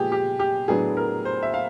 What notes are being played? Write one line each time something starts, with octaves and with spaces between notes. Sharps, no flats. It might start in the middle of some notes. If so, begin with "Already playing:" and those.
Already playing: A#2 F3 G#3 B3 G4 G#4
G4
G4
A2 F#3 B3 D4 G#4
A#4
C5
E5
F5